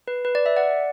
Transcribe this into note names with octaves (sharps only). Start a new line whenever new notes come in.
B4
B4
D5
E5
D5 F#5